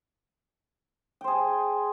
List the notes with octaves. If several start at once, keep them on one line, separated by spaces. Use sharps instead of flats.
G#4 C5 G5